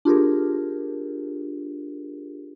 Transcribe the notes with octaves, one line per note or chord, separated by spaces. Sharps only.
D4 F4 G4 G#4 A#4